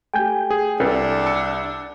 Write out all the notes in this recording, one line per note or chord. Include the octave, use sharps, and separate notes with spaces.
A3 G4 G5 G#5 G6
G#4
C2 D4 A4
A5 E6 C#7